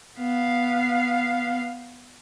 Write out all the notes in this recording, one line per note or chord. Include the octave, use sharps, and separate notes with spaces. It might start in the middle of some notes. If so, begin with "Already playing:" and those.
B3 F5